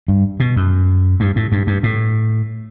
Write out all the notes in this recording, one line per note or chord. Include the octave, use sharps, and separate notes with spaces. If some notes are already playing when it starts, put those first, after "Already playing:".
G2
B2
F#2
G2
A2
G2
G2
A2